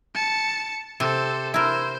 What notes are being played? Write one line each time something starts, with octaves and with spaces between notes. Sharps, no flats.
A5 C#7
C3 A4 C5
E4 A#4 C5